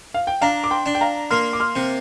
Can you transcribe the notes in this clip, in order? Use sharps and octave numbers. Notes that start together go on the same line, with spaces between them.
F5
G5
D4 F5 A#5
D6
G5 C6
D4
G5
F5 A#5
A#3 C6 F6
D6
C6 F6
C3